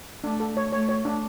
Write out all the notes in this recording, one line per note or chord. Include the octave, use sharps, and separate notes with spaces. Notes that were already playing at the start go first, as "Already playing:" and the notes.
A3 D4
A4
C#5
A3 C#5
C#5
D4